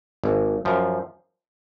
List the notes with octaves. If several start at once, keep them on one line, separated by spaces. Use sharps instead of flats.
G#1
F#2 F3